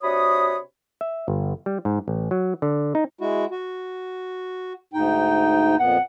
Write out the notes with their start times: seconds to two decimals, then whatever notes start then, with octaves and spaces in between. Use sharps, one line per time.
0.03 C3 D4 F#4 C#5 B5 D#6
1.01 E5
1.28 G1
1.66 G3
1.85 G#2
2.08 A1
2.31 F#3
2.62 D3
2.95 D#4
3.19 G#3 E4 F#4
3.51 F#4
4.93 D2 G#2 D#4 G5
5.79 F2 A#2 B3 F#5